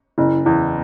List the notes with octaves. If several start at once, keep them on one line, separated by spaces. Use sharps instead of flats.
F#1 E4
E2 E4